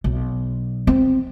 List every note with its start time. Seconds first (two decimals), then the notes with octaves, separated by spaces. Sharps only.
0.04 B1
0.87 C4